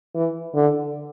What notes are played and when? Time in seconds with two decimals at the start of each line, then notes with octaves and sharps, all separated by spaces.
0.14 E3
0.55 D3